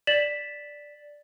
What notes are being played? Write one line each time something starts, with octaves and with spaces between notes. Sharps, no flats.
D5 A6 B6 E7 F#7